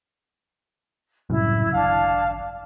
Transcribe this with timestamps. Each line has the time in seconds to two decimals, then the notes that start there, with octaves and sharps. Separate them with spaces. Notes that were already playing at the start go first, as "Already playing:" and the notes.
1.30 F#1 C2 F#2 A2 E4
1.74 G#1 D4 F5 A5